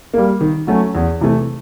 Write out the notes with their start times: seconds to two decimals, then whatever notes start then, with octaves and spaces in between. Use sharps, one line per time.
0.14 G3 A#3
0.41 D#3
0.67 F#3 A3 C#4
0.95 E2
1.21 C3 E3 A3